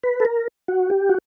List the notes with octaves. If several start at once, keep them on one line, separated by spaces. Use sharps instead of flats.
B4
A4
A#4
F#4
G4
F#4